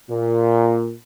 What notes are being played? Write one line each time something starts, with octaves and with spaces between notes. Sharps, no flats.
A#2